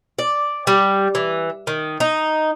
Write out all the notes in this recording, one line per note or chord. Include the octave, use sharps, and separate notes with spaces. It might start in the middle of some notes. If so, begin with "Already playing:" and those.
D5
G3
E3
D#3
D#4